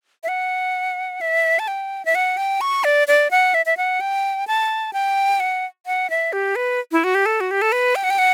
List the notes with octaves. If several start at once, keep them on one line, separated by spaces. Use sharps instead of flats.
E5
F#5
E5
A5
G5
E5
F#5
G5
C#6
D5
D5
F#5
E5
E5
F#5
G5
A5
G5
F#5
F#5
E5
G4
B4
E4
F#4
G4
A4
F#4
G4
A4
B4
G5
F#5
G5
F#5